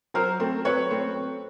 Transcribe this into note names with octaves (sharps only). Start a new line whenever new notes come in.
F#3 A#4 C5
A3 C4
F#3 B4 C#5
A3 C4